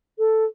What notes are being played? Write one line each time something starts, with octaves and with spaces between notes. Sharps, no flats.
A4